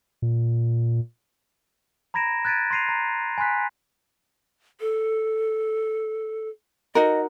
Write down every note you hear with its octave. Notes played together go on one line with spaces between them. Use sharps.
A#2
A#5 B5 G#6 A#6 D7 E7
F#6 G#6 A6 B6 D7 D#7
C6 A#6 C7 D#7 F7
A#5
G#5 B5 C6 F#6 B6
A4
D#4 F#4 A#4 D#5